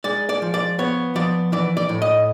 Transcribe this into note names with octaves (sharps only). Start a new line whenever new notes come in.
G#3 D5
D5
F3
D5
B3 C#5
F3 D5
E3 D5
D5
A2
D#5